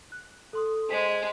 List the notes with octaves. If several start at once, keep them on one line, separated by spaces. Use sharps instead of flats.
F#6
A4 C6 D#6
G#3 C5 B6 D#7